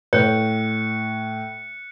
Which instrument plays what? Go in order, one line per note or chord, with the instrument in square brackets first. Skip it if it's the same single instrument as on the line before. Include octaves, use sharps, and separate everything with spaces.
[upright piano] A2 [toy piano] C#5 [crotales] F#6 C#7